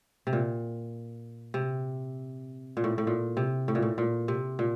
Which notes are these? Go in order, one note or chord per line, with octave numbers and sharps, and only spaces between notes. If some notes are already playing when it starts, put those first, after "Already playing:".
C3
A#2
C3
A#2
A2
A2
A#2
C3
A2
A#2
A2
A#2
C3
A#2